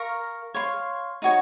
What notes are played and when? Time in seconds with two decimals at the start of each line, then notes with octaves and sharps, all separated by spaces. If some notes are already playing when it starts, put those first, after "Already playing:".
Already playing: A#4 F5 A#5 C#6
0.54 C#5 F5 C6
1.22 D#4 F#4 C#5